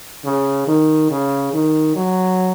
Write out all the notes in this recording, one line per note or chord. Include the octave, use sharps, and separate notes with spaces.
C#3
D#3
C#3
D#3
F#3